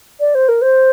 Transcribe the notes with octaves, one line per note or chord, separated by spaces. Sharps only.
D5
C5
A#4
C5